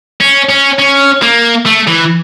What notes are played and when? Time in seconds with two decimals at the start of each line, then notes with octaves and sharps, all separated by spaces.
0.20 C#4
0.49 C#4
0.79 C#4
1.22 A#3
1.66 A3
1.88 E3